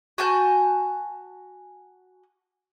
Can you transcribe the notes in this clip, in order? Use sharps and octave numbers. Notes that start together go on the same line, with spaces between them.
F#4 G#5 A5 G6